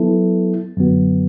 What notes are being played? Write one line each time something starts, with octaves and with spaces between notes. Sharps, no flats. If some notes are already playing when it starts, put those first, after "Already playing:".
Already playing: F#3 B3 E4 A4
F#2 D3 F#3 B3 F#4